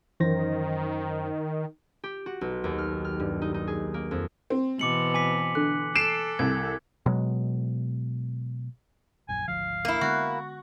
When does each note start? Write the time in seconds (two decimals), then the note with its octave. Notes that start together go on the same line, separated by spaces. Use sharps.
0.20 F#2 D#3 E3 C5 A#6
2.04 G4
2.26 F#4
2.41 B1
2.64 D#2
2.78 F6
3.05 F6
3.20 G2
3.42 D#4
3.54 D#4
3.67 G#4
3.94 A#3
4.11 F2
4.50 C4
4.79 B2 E3 D6 C#7 F#7
5.14 G#5 D6 B6
5.55 D3 F#6
5.95 A4 C7 D7 E7
6.39 C2 G#6
7.06 B2 F#3 G#3
9.28 D#1 A#1 F#2 G#5
9.48 G#1 D2 F3 F5
9.85 A#3 E4
10.01 D3 G#3 B3 F#4